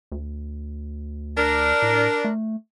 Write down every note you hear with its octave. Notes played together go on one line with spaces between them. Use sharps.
D2
D4 A#4
A2
A3